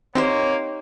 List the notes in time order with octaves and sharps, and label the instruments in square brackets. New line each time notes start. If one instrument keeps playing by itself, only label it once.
[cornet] A#3 [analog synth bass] C4 [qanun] D#4 G4 C5 [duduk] C#5